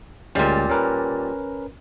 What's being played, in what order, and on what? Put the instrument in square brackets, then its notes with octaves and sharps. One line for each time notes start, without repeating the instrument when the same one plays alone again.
[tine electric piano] D2 G#3 C#4 [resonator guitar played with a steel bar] A#2 G3
[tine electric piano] C#4 A#4 B4